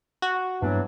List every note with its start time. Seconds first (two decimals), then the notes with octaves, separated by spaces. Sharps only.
0.22 F#4
0.62 G2 E3 F#3 A#3 B3 D4